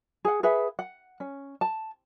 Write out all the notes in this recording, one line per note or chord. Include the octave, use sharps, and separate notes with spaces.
G#4 F#5
G#4 B4 E5 F#5
F#5
C#4
A5